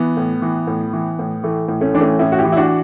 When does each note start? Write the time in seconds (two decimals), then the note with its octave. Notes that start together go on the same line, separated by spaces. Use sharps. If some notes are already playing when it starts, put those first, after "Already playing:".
Already playing: E3 B3
0.17 A2
0.42 E3
0.67 A2
0.93 E3
1.19 A2
1.44 E3 A3
1.68 A2
1.81 A3 C#4
1.94 E3 D4
2.00 A3 C#4
2.19 A2 C#4 E4
2.32 F#4
2.39 E4 G4
2.45 E3
2.52 E4
2.57 D4 F#4